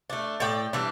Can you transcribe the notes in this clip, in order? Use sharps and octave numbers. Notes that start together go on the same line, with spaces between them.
A3 D4
A2 D5 G5
E3 G3 D4